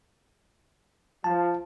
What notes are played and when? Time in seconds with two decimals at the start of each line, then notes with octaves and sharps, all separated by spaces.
1.24 F3 A5